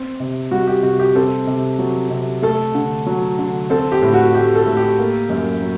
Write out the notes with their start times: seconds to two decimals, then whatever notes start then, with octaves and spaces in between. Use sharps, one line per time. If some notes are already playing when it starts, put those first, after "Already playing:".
Already playing: C4
0.20 C3
0.51 G3 F#4
0.67 G4
0.83 C3 F#4
0.99 G4
1.15 C4 A4
1.47 C3
1.79 F#3
2.10 C3
2.42 A3 A4
2.75 D3
3.06 F#3
3.39 D3
3.70 C4 A4
3.92 G4
4.02 A2
4.13 F#4
4.34 A3 G4
4.55 A4
4.65 A2
4.77 G4
4.98 A#3
5.30 F#2
5.61 F#3